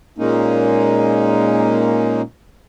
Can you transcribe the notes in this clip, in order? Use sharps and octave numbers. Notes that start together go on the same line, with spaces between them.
A#2 G#3 A#3 C#4 D#4